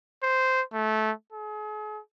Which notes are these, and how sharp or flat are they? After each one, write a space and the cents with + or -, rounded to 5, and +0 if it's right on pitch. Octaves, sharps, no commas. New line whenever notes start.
C5 -10
A3 -20
G#4 +40